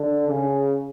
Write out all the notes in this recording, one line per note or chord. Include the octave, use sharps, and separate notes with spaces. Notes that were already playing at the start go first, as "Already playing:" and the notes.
Already playing: D3
C#3